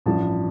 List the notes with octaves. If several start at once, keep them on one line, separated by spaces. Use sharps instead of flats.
A1 G2 F3 A5